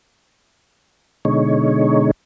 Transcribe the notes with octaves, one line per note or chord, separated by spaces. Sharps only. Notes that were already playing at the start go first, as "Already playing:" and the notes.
B2 D3 G#3 D#4 C#5